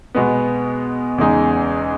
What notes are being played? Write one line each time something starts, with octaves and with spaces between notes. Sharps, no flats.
B2 G#3 B3
E2 C#3 G#3 D#4